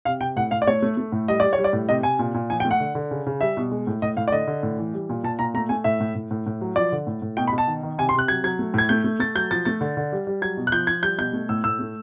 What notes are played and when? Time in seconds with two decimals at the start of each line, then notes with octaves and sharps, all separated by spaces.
0.05 C3 F5
0.21 C3 G5
0.36 A2 F#5
0.51 A2 F5
0.62 D5
0.67 A3 C#5
0.82 A3
0.97 A3
1.12 A2
1.28 G3 D#5
1.40 G3 D5
1.53 C#5
1.58 G3
1.64 D5
1.73 A2
1.89 C3 D#5
2.03 C3 G#5
2.19 A#2
2.34 A#2
2.50 F3 G#5
2.60 G5
2.65 A3
2.71 F#5
2.80 D3
2.95 D3
3.11 C#3
3.26 C#3
3.41 G3 E5
3.57 B2
3.72 G#3
3.87 A2
4.02 A2 D#5
4.17 A2 F5
4.28 D5
4.32 D3 D#5
4.47 D3
4.63 A2
4.79 E3
4.94 G3
5.09 A#2
5.23 A#2 A5
5.39 A#2 A#5
5.54 A3 A#5
5.69 A3 G#5
5.84 A2 E5
6.01 A2
6.15 A2
6.31 A2
6.46 A2
6.61 F#3
6.76 F3 D5
6.92 D3
7.07 A2
7.22 A2
7.37 B2 G5
7.48 B5
7.52 B2
7.58 A5
7.68 D#3
7.83 D#3
7.98 C3 G#5
8.09 C6
8.14 C3 F#6
8.28 F#3 G#6
8.44 F#3 G#6
8.59 A3
8.74 A2 G#6
8.89 A3 G6
9.04 A3
9.20 A3 A6
9.35 F#3 G6
9.51 F3 A6
9.65 A3 A6
9.81 D3
9.97 D3
10.12 G3
10.27 G3
10.42 F#3 G#6
10.57 B2
10.67 F#6
10.72 F3 G6
10.87 F3 G#6
11.02 G3 G6
11.18 B2 G6
11.33 A3
11.49 A2 E6
11.64 A2 E6
11.79 A3